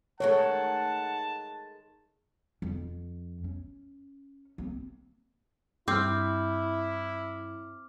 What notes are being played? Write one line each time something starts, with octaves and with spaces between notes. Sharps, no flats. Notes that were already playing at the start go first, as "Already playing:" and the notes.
D#3 G#3 A3 C#5 F#5 A5
F2
C#4
A#3 C4
G2 C4 E4 D6 F6